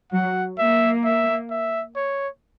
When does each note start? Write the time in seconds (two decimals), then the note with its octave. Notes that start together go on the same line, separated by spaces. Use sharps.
0.12 F#3 F#5
0.59 A#3 E5
1.05 E5
1.51 E5
1.96 C#5